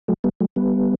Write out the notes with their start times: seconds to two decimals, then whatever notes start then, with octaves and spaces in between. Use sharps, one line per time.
0.08 F#3 A3
0.24 G3 B3
0.40 F#3 A3
0.56 G3 B3